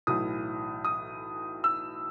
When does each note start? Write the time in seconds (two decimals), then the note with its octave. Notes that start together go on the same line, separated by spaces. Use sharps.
0.07 B1 A2 E3 D#6
0.85 D#6
1.64 E6